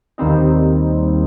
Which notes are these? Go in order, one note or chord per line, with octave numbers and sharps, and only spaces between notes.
D#2 D#3 G3 C4 D#4